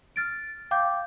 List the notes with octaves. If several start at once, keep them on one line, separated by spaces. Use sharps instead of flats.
F6 A6 D7
F5 G5 D6 G6